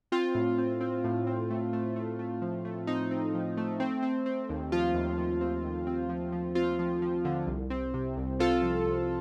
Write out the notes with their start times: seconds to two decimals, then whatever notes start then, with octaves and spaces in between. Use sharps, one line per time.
0.12 C4 F4
0.35 A2
0.58 C4
0.81 C4
1.04 A2
1.27 C4
1.50 A3
1.73 A3
1.96 A3
2.19 A3
2.42 F3
2.65 A3
2.87 C4 D#4
3.11 C4
3.34 F3
3.57 A3
3.80 C4
4.03 C4
4.26 C4
4.49 D#2
4.72 F3 F4
4.94 D#2
5.18 F3
5.41 C4
5.64 D#2
5.87 C4
6.09 F3
6.32 F3
6.55 C4 F4
6.79 F3
7.02 F3
7.25 D3
7.47 C2
7.70 C4
7.94 C3
8.17 C2
8.39 C4 F4 A4
8.62 F3
8.86 C2